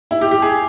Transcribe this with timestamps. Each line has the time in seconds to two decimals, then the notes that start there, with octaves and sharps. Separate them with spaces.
0.11 E4
0.21 G4
0.31 G4
0.42 G#4